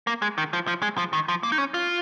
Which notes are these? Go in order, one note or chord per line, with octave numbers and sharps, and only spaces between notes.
A#3
G#3
D#3
F3
F3
G#3
F3
D#3
F3
A#3
D#4
C#4
F4